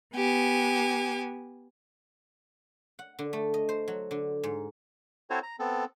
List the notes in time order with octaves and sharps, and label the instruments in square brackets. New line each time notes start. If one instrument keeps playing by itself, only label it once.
[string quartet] B3 G4 G#5
[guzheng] F#5
D3
A3
D#5
C5
F#3
D3
G#2
[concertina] C4 E4 F#4 A4 C5 C#5
A#5
B3 C4 A4